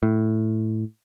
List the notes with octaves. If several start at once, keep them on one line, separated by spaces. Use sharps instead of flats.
A2